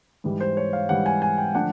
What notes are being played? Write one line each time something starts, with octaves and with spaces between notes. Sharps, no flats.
G#2 E3 G3
C5
C#5
F5
G#2 E3 G3 F#5
G#5
G#5
G5
D3 F3 A3 D4 F#5